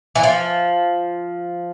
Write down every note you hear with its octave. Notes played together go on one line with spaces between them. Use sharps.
E3
F3